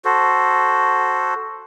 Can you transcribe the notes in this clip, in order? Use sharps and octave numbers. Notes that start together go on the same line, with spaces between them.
F#4 A4 C5